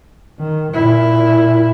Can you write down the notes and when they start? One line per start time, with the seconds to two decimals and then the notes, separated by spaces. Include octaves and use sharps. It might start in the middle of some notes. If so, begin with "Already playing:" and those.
0.40 D#3
0.73 A#2 E4